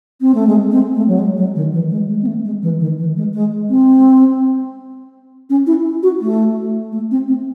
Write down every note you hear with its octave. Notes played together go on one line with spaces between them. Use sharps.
C4
A3
G#3
C4
A3
F#3
G#3
F#3
D#3
E3
G#3
G#3
C4
A3
G#3
E3
D#3
E3
G#3
G#3
C4
C#4
E4
F#4
A3
A3
C4
C4